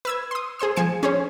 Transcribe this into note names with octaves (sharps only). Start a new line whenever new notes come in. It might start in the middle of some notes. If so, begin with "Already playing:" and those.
B4 E6 G#6
C6 D#6
G#4 C5 C6 E6
F3 G#5 C#7 E7
C#4 G#4 C5 C#5